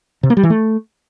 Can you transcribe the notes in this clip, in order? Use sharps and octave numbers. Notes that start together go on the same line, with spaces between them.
C3
A#3
G3
E3
A3